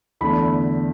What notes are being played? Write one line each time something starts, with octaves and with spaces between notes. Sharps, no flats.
E2 D3 A3 E4 B5